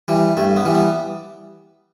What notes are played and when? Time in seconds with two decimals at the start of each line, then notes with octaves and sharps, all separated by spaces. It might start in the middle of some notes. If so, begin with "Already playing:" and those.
0.08 E3 G3
0.37 G2 A3
0.56 B3
0.65 E3 G3
0.75 B3